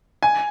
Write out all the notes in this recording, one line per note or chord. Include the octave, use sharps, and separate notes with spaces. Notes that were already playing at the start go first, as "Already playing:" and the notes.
G#5